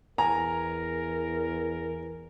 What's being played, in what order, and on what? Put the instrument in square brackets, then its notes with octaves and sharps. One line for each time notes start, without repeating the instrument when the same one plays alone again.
[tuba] E2 [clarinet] A#4 [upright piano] G#5 A#5